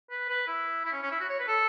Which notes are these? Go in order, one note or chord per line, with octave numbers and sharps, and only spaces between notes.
B4
B4
E4
E4
C#4
C#4
E4
F#4
C#5
B4
A4